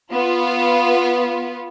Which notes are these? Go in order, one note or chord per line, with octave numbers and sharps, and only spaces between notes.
B3 F4